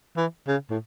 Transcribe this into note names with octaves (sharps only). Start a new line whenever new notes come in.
E3
C#3
A2